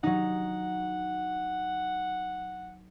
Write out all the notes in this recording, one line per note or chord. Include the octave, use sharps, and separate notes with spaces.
F#3 D#4 F#5